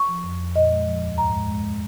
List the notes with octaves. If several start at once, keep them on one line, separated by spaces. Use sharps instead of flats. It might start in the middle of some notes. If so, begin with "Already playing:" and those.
Already playing: C#6
F3
F2
F2
A#2 D#5
G#3
F3
D#2
G#2 A#5
G#3
G#3
G#3